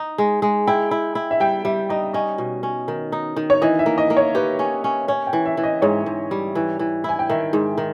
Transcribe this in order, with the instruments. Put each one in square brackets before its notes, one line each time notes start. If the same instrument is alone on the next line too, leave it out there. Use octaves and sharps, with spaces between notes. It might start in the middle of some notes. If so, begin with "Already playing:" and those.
Already playing: [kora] D#4
G#3
G#3
[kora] E4 [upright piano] G5
[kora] E4
E4
[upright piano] E5
[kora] G3 [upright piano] G5
[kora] G3 [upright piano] E5
[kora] D#4 [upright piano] D#5
[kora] C#4 [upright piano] D#5
[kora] B2
C#4
D#3
D#4
D#3
[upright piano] C#5
[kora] E3 [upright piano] D#5
[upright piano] E5
[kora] A#3
[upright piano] D#5
[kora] A#3
[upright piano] C#5
[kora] G4 [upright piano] B4
[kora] C#4
C#4
[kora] C#4 [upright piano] C#5
[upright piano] G5
[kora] E3
[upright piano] E5
[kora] E3
[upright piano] D#5
[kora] G#2 [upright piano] C#5
[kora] G#2
G3
E3
E3
[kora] E4 [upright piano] G#5
[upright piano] G5
[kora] D#3 [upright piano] E5
[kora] G#2
D#3